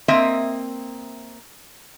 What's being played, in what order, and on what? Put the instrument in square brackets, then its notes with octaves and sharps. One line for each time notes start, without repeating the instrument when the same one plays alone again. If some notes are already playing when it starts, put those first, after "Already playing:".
[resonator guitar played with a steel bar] A#3 C4 D#5 E5